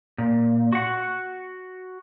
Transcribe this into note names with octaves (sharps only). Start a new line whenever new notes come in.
A#2
F#4 F#5